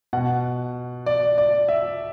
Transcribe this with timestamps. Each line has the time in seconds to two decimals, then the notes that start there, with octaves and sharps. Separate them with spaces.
0.13 B2 F#5
1.06 D5
1.38 D5
1.69 E5